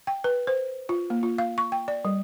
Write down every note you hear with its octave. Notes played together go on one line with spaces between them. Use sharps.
G5
B4
C5
F4
A#3
F4
F5
C#6
G5
D5
G3